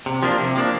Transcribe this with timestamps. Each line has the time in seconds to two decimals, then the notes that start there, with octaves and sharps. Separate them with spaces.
0.06 C3
0.23 F3 A#3 D4
0.39 C3
0.56 F3 A#3 D4